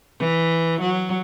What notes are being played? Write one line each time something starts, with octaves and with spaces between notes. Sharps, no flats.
E3
F#3